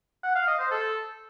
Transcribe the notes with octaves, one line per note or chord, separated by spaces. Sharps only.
F#5
F5
D#5
C5
A4